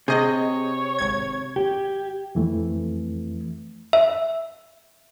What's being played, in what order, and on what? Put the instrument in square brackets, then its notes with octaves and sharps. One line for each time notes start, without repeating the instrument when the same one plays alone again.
[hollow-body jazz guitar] C3 [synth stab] G#4 D#5 [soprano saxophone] C#5
[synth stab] G#1 G#6
[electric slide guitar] G4
[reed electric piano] F2 E3 A3
[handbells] E5